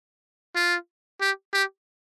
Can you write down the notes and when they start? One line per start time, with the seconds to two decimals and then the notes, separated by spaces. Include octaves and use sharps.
0.56 F4
1.21 G4
1.53 G4